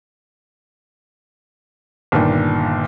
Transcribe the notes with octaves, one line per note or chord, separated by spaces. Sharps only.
G1 A#2 D#3